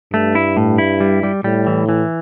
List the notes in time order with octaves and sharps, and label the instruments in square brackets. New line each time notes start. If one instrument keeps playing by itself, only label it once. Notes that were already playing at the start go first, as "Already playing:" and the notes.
[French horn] G2 [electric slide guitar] A3
[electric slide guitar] E4
A2
E4
G3
G3
[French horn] A2 [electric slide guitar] G3
[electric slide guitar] E3
E3